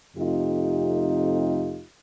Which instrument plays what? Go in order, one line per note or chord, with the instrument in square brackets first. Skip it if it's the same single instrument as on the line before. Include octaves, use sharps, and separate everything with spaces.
[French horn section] F2 C3 A3 D#4 F4 G4